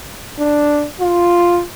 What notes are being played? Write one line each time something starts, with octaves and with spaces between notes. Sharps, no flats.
D4
F4